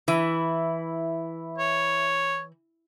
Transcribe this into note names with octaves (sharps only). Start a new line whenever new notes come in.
E3 E5 B5
C#5